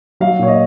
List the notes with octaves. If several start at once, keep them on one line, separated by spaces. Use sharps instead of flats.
F#3 F5
A#2 C#5
D#5